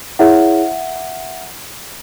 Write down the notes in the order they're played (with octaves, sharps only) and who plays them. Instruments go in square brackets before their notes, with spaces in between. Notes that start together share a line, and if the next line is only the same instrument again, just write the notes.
[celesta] E4 G#4 C#5 E5 F#5